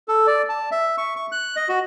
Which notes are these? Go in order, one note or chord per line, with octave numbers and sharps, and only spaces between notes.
A4
D5
A5
E5
C#6
C#6
F#6
D#5
F#4